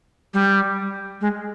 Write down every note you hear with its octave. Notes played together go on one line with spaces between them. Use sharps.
G3
G#3